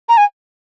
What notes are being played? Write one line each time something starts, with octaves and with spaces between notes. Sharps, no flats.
A#5
G#5